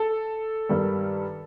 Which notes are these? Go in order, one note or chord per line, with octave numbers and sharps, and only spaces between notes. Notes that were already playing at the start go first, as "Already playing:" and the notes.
Already playing: A4
G2 D#3 G3